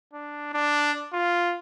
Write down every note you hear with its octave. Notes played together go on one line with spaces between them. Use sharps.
D4
D4
F4